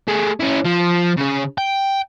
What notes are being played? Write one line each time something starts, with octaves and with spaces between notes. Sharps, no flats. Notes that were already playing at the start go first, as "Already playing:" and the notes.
A3 G#4
C#4 E4
F3
C#3 G#4
G5